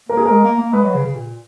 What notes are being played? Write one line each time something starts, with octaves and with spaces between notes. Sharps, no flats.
A#3 A#4
G#4
G#3 A#4
A#3
A#3
G#3 B4
F#3
C#3
C#3
A#2